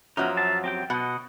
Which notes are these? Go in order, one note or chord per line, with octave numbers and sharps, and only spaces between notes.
F#2 F3 F#3 B3 D#4
E5 F5 A5
C4 G4 G5
B2 D#5 F#5